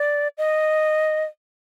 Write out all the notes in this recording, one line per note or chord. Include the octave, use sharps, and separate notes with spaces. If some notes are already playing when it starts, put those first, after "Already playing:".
Already playing: D5
D#5